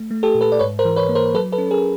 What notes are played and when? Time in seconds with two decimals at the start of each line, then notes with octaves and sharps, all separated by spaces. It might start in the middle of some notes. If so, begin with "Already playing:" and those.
Already playing: A3
0.11 A3
0.23 G4 A4
0.35 A#2
0.41 A4 B4
0.52 D5
0.59 G#2 B4 C#5
0.79 A#4 C5
0.85 E3
0.96 B4 C#5
1.09 A#3
1.15 A#4 C5
1.34 F#3 A4 B4
1.52 A4 B4
1.58 C#4
1.71 G#4 A#4